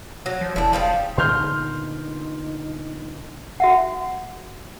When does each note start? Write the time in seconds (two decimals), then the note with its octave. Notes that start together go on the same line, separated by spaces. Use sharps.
0.26 F#3
0.41 F3
0.56 E1 D3 D4 E4
0.73 C#3 F3 G3
1.18 A#2 D3 B3 D#4 C6 F6 G6
3.60 F#4 E5 F#5